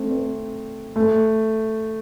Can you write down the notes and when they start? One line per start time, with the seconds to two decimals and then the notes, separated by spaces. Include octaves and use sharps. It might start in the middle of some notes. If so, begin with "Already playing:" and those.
Already playing: A3 C4
0.11 C4
0.96 A3